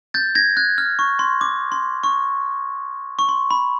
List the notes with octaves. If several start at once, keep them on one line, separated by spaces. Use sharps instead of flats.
G6 A6
G#6 A#6
F#6 G#6
F6
C#6
C6
D6
C6
C#6
C#6
C6
B5